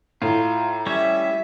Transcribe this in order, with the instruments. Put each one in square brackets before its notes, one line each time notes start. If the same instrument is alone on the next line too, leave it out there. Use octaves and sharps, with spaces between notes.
[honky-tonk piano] A2 [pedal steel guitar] F4 [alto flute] A#5
[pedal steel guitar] G3 C#4 C#5 [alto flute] G4 [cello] E5